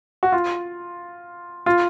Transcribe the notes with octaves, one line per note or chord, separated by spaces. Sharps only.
F#4
F4
F4